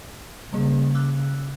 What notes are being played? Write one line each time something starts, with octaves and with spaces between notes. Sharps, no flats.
C#3 G3 A#3 G#4
D6 E6 F#6